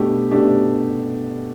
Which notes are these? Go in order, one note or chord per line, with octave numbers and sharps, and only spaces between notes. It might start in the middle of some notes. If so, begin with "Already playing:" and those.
Already playing: B2 A3 D4 G4
B2 A3 D4 G4